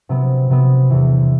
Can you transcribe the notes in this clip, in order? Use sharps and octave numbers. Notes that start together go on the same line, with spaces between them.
C3 F#3 B3
C3 F#3 B3
E2 C3 E3